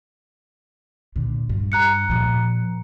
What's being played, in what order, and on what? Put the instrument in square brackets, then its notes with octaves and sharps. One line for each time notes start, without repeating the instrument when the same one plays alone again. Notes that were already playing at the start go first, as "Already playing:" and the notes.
[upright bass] A#2 D3
G2
[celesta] A#5 F#6 C#7
[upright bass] A#2 F3